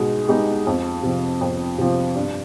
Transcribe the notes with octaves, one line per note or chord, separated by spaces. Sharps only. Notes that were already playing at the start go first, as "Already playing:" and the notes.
Already playing: B2 G#3 D#4
G#3 B3 D#4 G4
F2
C3 F3
F2
C3 F3
G2